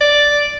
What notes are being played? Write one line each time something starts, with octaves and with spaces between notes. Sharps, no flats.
D5